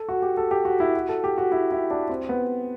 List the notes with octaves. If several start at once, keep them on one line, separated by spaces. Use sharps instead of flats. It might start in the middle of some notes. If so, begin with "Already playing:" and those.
Already playing: A4
F#4
G4
A4
G4
F#4
E4
F#4
A4
G4
F#4
E4
E4
D4
C4
B3